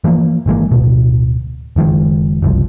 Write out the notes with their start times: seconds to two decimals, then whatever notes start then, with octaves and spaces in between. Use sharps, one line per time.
0.04 E3 F3 A3 A#3
0.46 G#1 E3 G#3 A#3
0.71 D1 B2
1.76 F#1 D#3 F3 G#3
2.42 F#1 C2 F3